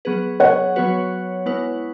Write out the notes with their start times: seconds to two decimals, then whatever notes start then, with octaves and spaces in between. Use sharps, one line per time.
0.05 F#3 B3 G#4 B4
0.40 C#5 F#5
0.76 F#3 B3 F#4 B4
1.46 G#3 B3 E4 B4